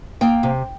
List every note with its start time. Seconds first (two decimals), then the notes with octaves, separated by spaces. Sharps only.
0.21 A#3 G5
0.43 C3